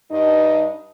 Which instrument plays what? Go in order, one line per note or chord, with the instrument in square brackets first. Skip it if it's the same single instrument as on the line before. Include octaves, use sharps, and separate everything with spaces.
[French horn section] G2 D#4 D#5